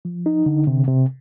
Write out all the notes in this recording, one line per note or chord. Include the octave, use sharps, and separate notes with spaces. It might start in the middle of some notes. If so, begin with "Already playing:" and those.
F3
D#4
D3
C3
C3